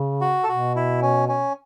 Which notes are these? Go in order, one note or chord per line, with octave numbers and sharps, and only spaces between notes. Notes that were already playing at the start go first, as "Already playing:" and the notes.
Already playing: C#3
F#4
A4
B2 F#4
E4
C#4
C#4